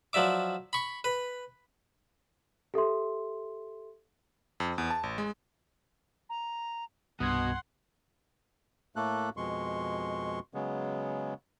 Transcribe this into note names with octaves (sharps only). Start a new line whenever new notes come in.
F3 F#3 D5 E5 D6
B5 C#6
B4
G4 A4 E5 C6
F2
E2
A5
A1
G#3
A#5
C2 G2 B2 F#5 C6 D#6 G#6
A2 A3 A#3 A4 F#6
F2 B2 G#3 C6 C#6
C#3 F#3 G#3 B3